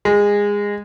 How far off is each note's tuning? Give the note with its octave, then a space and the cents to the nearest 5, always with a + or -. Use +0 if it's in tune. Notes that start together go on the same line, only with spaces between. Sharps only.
G#3 -20